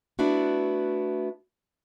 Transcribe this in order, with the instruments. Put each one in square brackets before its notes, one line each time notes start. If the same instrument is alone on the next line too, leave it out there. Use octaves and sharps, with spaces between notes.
[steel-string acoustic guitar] A3 B3 D4 E4 F#4